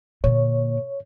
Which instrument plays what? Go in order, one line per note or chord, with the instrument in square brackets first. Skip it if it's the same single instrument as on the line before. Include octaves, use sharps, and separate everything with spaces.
[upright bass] A#2 D3 [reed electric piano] C#5